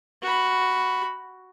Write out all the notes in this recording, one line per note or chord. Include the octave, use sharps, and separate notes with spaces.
F#4 B5